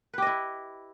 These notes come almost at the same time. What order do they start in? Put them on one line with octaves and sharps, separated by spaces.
B4 G4 D#5 E4